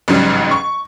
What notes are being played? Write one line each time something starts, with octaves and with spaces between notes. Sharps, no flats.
A1 G#2 C#3 F#3 G3
C#6